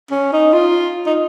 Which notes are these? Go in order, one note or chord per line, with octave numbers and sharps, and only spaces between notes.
C#4
D#4
F4
D#4